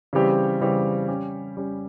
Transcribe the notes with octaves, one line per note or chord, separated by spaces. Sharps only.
C#3 E3 G3 C4 G4
C#3 E3 G3 C4 G4
G3 C#4 G4
G3 C#4 G4